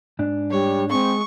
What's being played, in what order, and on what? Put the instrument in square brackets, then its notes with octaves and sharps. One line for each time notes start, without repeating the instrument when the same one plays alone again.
[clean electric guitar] G#2 D4
[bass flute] G3 [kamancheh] C#5
[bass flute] G#3 [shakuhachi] C4 [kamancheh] C#6